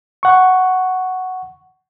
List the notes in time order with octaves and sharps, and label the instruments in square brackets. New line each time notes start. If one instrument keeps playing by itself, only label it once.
[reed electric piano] F#5 C#6